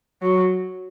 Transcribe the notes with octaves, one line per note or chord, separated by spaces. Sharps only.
F#3